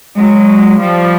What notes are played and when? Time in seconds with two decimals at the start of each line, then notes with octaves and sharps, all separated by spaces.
0.16 F#3 G#3
0.80 F3 G3